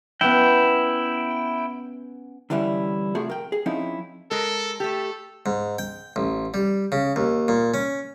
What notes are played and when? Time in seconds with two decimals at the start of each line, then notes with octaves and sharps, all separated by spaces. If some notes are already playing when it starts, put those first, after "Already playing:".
0.21 B3 C#4 E4 G5
2.50 D3 E3 G3 C#4 E4
3.15 C3 F3 A3 F#4 G#4
3.30 A#4 G5
3.52 G#4
3.66 F3 C4 C#4 D#4 E4
4.31 G#3 A4 A#4
4.80 A3 G4 A4
5.46 G#2
5.79 G5
6.16 A1
6.54 G3
6.92 C#3
7.16 D#2
7.48 A#2
7.74 C#4